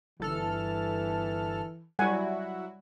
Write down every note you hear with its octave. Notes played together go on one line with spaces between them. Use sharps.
G1 E3 A4 F6
F#3 G3 E4 F#4 F#5 G#5